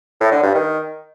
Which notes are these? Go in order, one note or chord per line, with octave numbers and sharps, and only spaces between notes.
A2
D3
G2
D#3